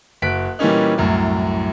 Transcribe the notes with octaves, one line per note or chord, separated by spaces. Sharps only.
F#1 F#4 F#6 B6 D7
A#2 E3 G3 A#3 C#4 D#4
C2 F#2 A2